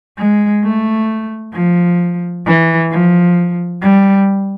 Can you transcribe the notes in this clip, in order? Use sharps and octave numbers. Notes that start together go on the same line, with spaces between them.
G#3
A3
F3
E3
F3
G3